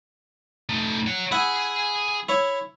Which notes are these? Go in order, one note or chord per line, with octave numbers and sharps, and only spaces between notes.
A3 D#4
C#5 F#5
E4 G#4 F#5
E4 C#5